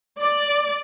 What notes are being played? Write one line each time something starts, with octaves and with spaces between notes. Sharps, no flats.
D5